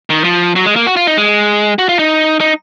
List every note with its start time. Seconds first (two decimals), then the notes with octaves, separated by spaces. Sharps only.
0.10 D#3
0.24 F3
0.56 F#3
0.66 G#3
0.76 A#3
0.87 F#4
0.96 F4
1.07 D#4
1.17 G#3
1.79 F#4
1.89 F4
1.99 D#4
2.40 D#4